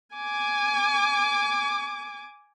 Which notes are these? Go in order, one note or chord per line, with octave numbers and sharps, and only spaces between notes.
G#5 D6